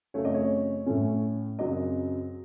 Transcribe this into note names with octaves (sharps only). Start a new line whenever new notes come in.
F#2 C#3 A3 C4 C#5
D#5
C#5
A2 A3 C#4
F#2 C#3 F#3 C4 D#5